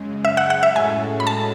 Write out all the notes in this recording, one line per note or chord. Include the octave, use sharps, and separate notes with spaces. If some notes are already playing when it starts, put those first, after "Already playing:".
Already playing: F#2 C#3 G#3
E5
F#5
F#5
E5
A2 G#3 C#4 F#4 A4 G#5
B5
A5